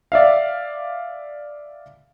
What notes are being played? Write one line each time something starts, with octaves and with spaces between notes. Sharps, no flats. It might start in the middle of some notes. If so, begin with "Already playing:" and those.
D5 E5 F5